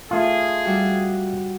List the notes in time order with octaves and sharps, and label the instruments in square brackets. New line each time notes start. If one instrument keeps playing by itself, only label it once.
[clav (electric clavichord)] A3 F4 [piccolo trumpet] G#4
[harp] G3 F#4